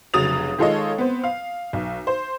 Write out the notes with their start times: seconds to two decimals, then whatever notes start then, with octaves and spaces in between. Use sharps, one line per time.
0.14 F1 C#3 F#3 D#6 A6 F7
0.58 D#3 G#3 F4 A4 C#5 D#5
0.98 B3 C4
1.24 F5
1.73 B1
2.07 C5